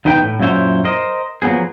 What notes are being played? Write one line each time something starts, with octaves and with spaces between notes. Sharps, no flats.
E2 D#4 B4 G5
A2
F#2 A#2 F#3 E4 C5 C#5
A#4 C5 D#5
F3 F#3 A#3 B3 G#4